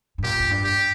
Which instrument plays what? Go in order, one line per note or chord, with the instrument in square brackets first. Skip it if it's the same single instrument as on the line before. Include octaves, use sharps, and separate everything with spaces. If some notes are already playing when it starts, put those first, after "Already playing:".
[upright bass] G2
[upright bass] A#2 [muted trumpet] G4
[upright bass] F2
G2
[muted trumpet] G4